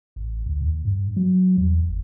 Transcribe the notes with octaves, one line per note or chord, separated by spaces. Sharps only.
A1
D2
D#2
G2
F#3
E2
G1